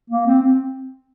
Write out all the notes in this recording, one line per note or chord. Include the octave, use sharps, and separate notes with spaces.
A#3
C4
C4